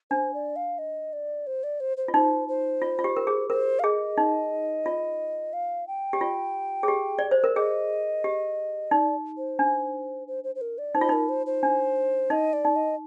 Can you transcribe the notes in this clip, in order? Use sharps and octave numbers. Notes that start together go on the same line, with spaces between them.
D4 C5
D5
F5
D#5
D5
C5
D5
C5
C5
F4
D#4 C5
C5
F4
F4
G4
A#4
G#4
A#4 C5
F5
G#4 D#5
D#4
F4
F5
G5
G4
F4
G#4
G4
D5
C5
A#4
G#4 D#5
G4
D#4 D5
C5
D4
C5
C5
C5
A#4
D5
D#4 C5
F4
D#4 A#4
C5
C5
D4
D#4 D#5
D5
D#4
D#5